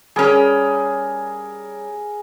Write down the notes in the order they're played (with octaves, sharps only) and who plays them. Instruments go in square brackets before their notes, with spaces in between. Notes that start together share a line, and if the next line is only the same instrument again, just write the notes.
[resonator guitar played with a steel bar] G3 C#4 [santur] G#4 A#4